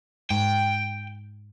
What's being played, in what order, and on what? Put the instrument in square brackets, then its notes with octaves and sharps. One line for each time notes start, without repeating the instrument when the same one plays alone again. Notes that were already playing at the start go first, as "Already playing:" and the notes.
[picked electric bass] G#2 [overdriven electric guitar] G5